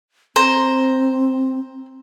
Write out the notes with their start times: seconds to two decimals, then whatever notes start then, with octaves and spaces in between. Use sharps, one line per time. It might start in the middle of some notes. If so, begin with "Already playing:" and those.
0.36 C4 C5 A#5